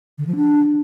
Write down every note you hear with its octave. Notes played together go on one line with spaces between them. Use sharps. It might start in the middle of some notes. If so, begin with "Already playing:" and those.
D3
F3
D4